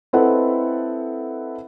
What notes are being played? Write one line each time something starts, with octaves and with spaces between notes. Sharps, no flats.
C4 E4 A4 B4 D#5 F#5